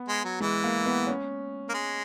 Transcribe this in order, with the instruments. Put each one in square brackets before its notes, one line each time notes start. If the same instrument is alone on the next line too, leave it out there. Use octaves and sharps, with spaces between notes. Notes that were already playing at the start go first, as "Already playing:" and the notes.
Already playing: [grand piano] B3
[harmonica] G#3
F#3
[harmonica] E3 [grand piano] G#3
[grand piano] A#3
B3
C#4
[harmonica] A#3
G#3